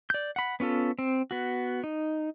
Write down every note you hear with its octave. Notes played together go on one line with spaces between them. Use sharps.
D5 G6
F#5 B5
B3 C#4 F4 A4
C4
B3 F#4
D#4